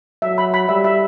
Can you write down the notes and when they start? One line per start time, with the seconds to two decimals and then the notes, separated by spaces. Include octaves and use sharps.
0.22 F#3 E5
0.38 B5
0.54 B5
0.69 G3 E5
0.84 E5